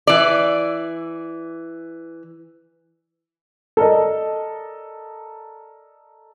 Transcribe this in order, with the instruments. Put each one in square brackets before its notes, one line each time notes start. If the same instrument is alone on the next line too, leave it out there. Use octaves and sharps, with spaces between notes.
[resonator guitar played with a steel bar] E3 D5
[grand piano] A4 A#4 D5 D#5